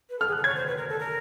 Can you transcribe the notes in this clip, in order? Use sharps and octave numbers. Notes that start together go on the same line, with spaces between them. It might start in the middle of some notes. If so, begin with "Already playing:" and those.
B4
A4 F6
G#4
A4 F#6
C#5 G#6
C5
B4
A#4
A4
A#4